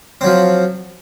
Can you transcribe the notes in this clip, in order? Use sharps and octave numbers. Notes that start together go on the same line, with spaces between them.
F3 F#3 C4